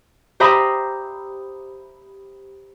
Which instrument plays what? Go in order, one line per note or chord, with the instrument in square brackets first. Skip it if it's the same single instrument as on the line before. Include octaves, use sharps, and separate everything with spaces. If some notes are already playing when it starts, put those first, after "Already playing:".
[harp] G4 C5 E5 A#5 B5 D#6